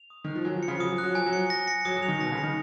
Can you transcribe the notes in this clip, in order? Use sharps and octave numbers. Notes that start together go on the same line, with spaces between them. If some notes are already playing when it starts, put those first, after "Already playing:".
Already playing: F7
D#6
D#3 F#6
F3
F#3 G#5
F3
C#7
C#3
F3
F#3 D#6
F3
F#3 F#6
F3 G#5
F#3
C#7
A#6
C#7
F#3 D#6
F#3
F7
D#3
B2 A#6
C#3
C#7
D#3